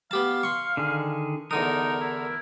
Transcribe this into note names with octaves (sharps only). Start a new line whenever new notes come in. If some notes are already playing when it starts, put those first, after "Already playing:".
B3 G4 F5 A5
C6 C#6
D3 D#3 G#4
E2 D3 D#4 A#4 D#6
E4